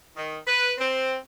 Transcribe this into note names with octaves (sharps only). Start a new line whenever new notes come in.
D#3
B4
C4